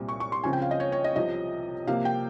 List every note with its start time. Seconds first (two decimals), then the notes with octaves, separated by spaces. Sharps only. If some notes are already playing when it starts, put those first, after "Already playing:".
Already playing: C2 A#2 G3 C4
0.09 C#6
0.20 C#6
0.32 C6
0.44 C#2 C#3 F3 C4 G#5
0.53 G5
0.62 F5
0.71 D#5
0.80 C#5
0.92 C#5
1.04 D#5
1.16 C2 C3 F3 D#5
1.87 C3 F3 A#3 F5
2.05 G5